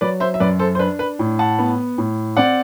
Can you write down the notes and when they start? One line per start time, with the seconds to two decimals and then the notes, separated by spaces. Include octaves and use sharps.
0.01 F#3 B4 D5
0.20 C5 E5
0.34 E5
0.40 F#2 B4 D5
0.59 A4 C5
0.75 C5
0.79 D4 B4
0.99 B4
1.19 A2
1.39 F#5 A5
1.59 B3
1.98 A2
2.37 C4 D5 F#5